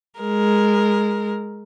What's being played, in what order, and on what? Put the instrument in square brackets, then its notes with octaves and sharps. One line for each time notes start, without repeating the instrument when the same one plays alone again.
[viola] G#3 A#4